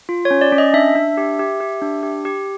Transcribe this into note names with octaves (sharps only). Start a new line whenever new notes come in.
F4
C#5
C#4
D5
C#4
D#5
D4 E5
D4
G4
G4
G4
D4
G4
G4